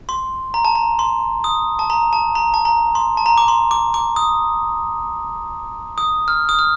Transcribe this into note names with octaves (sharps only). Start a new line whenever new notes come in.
C6
A#5
A5
A#5
C6
D#6
A5
A#5
A5
A#5
A5
A#5
C6
A5
A#5
D6
C6
D6
D6
D#6
D#6
F6
D#6
F6